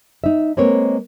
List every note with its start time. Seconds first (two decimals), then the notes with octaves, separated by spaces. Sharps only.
0.24 D#4 E5
0.57 G#3 A#3 C4 A#4 B4 C#5